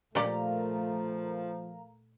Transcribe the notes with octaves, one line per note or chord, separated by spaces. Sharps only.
A#2 F3 A3 G4 A#4 D5 F5 A#5